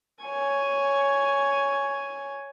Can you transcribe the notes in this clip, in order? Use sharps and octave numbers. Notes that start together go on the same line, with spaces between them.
C#5 G#5